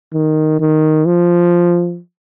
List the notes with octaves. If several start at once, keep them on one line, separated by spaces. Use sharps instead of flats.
D#3
D#3
F3